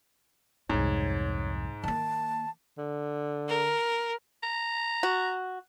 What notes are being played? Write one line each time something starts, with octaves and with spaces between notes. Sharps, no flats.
C2 F2 G#2 C#5
D#3 A#3 A5
D3
A#4
A#5
F#4